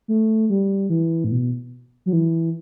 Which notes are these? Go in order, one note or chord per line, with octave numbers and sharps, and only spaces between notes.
A3
G3
E3
A2
B2
F#3
E3